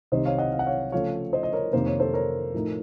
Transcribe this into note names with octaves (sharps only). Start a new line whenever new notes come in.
C2 C3 D#3 C5 D#5
C#5 F5
D#5 F#5
F5
F#5
C#5 F5
C#3 F3 A3 C#5 F5
C5 D#5
D#5
A#4 C#5
F2 C3 D#3 A#3 C5
C#5
A4 C5
A#4 C#5
A2 F3 A3 D#4